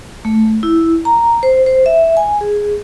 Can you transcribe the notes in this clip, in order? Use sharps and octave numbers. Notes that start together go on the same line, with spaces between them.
A3
E4
A#5
C5
C5
E5
G#5
G#4